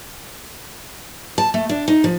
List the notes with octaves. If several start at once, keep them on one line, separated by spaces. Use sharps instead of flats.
A5
A3
D4
D#4
F3